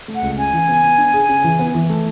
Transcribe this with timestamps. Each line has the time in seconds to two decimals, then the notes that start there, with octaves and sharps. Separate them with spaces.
0.08 A3
0.15 F#5
0.22 C#2
0.37 C#3 G#5
0.53 E3
0.68 B3
0.83 B3
0.98 D4
1.14 G#4
1.29 C#3
1.44 E3
1.59 B3
1.75 E3
1.90 A3